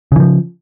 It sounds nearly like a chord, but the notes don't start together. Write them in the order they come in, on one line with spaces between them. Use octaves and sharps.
C#3 E3 F3